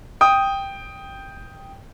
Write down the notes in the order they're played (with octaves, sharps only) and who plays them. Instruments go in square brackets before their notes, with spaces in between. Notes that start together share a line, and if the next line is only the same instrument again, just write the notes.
[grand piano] G5 D#6